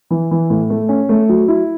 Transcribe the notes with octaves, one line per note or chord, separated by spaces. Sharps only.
E3
E3
A2
A3
C#4
A3
F#3
E4